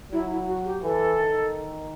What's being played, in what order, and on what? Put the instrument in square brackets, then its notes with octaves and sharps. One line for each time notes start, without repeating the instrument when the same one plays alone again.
[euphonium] F#3 [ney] E4
[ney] E4
F#4
G4
[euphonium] E3 [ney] A4
[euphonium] D#3